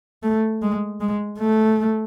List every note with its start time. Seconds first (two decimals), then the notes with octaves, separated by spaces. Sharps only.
0.23 A3
0.62 G#3
1.01 G#3
1.39 A3